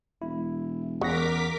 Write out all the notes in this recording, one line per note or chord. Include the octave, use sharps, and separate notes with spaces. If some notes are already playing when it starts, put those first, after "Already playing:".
E1 E4
E2 C#3 A#4 F#5 D6 A#6 B6